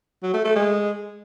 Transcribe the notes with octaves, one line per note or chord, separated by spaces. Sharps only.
F#3
A3
A3
G#3